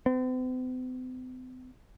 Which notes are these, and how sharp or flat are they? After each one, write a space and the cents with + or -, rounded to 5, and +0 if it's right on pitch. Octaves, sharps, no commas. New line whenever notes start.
C4 -45